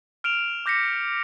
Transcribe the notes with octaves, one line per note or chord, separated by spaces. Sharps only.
F6 D7 E7 F7
D6 G6 A#6 B6 C#7